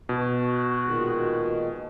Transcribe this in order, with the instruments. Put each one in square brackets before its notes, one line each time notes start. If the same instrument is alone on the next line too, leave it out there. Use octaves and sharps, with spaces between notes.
[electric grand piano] B2 [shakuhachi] F#4
[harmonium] A#2 D#3 G#3